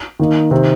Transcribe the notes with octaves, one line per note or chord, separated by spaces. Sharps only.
D#3 A#3 D#4
C3 D#3 C4